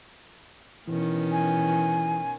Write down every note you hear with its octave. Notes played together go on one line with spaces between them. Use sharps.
B2 D#3 E3 C#4
G#5